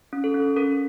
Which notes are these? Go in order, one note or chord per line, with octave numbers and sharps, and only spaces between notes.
C#4
A4
C#4
C#4 A#4